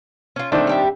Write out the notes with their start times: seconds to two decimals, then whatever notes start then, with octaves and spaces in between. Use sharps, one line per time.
0.36 C#4 F4
0.52 D#3 A3 C4 D4
0.67 G3 G4 E5